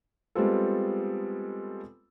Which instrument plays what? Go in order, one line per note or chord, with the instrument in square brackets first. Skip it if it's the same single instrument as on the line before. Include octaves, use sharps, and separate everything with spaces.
[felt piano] G3 G#3 B3 C4 F4 A4